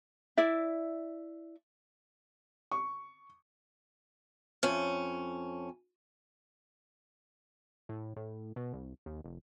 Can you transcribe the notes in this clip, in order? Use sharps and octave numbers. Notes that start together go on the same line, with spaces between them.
E4 D5 E5
C#6
F2 C#4
A2
A2
B2
C2
D#2
F1